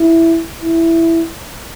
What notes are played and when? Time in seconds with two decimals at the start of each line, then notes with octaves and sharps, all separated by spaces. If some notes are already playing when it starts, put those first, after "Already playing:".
Already playing: E4
0.62 E4